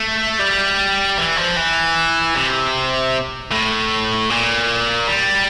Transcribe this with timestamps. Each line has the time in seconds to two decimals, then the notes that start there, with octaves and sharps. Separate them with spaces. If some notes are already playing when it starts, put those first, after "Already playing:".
Already playing: A3
0.40 G3
1.18 E3
1.37 F3
1.57 E3
2.35 C3
3.51 A2
4.30 A#2
5.08 G3